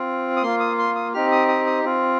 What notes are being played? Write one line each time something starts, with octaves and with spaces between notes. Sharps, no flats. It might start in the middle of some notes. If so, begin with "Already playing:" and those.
Already playing: C4 F4
D#6
A#3 F4 C6
D#6
C6
D#6
C4 D#4 G4 F6
D#6
D#6
D#6
C4 F4